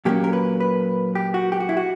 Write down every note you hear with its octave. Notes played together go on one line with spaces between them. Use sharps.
A#2 F#3 A#3 C#4 G4
A#4
B4
B4
G4
F#4
G4
F#4
E4
F#4